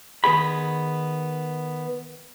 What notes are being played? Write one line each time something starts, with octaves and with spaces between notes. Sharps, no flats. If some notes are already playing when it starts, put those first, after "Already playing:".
D#3 B3 G#4 B5